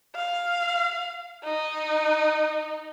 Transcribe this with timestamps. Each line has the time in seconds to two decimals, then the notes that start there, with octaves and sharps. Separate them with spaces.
0.15 F5
1.44 D#4